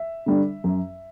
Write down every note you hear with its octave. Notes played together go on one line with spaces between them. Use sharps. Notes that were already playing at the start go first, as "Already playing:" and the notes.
Already playing: E5
D3 G3 D4
F#2